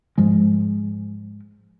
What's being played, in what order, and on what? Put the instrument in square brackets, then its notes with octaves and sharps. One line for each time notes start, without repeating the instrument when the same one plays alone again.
[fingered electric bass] G#2 F3 G#3